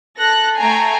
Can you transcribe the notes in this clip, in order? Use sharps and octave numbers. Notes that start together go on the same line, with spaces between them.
A4 F#6 A#6
A3 G5 G#5 A#5 C7